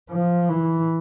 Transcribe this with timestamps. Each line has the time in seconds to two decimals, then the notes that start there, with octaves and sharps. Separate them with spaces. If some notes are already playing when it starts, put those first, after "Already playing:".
0.10 F3
0.49 E3